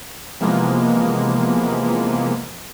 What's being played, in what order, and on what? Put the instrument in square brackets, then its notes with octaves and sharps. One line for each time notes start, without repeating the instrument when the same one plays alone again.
[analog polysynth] C3 E3 F3 G#3 A#3 B3